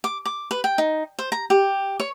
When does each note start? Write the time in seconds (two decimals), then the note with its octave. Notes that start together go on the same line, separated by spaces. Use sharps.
0.04 D6
0.26 D6
0.51 B4
0.64 G5
0.78 D#4
1.19 C5
1.32 A#5
1.50 G4
2.00 C#5